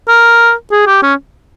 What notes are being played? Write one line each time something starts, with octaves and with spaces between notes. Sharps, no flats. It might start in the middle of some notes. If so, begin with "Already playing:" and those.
A#4
G#4
G4
C#4